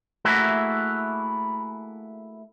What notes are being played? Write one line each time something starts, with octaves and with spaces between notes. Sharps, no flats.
A3 A#3 E4 F#4 G#4